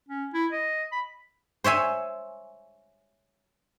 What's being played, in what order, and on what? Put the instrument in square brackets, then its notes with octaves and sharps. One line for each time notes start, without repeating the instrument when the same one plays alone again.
[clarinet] C#4
E4
D#5
B5
[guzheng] C5 C#5 E5 G#5